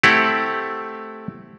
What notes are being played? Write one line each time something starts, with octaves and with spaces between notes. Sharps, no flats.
A3 C4 E4 G4 F#5